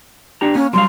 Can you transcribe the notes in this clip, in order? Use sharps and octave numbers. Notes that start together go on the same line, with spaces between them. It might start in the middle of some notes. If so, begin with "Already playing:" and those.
D4 G4 A#5
A#3 C#4
F#3 G3 F5 C6